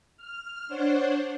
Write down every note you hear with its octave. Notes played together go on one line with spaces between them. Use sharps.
F6
D4 C5 C#5 F#5